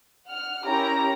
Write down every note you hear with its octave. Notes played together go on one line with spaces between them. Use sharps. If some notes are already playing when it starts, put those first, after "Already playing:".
F#5 F6
C#4 E4 G4 A#4 A#5